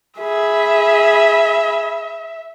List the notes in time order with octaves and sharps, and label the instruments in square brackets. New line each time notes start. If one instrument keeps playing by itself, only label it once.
[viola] G#4 B5 [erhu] E5